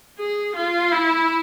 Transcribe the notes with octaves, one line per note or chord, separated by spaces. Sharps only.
G#4
F4
E4